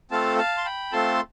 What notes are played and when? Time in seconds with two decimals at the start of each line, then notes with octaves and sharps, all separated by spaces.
0.11 A3 C4 F4 A4 F5 A5
0.38 F5 A5
0.57 C6
0.65 G5 B5
0.92 A3 C4 F4 A4 A5 C6